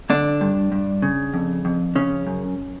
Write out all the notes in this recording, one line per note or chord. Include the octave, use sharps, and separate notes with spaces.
D3 D4
G2
G2
C#3
F2
F2
C#3 C#4
F#2